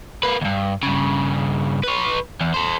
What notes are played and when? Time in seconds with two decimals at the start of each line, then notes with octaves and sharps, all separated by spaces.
0.23 A#3 B4
0.41 D2 G2
0.83 G2 C#3
1.83 B4 C#5
2.40 E2
2.54 A4 C5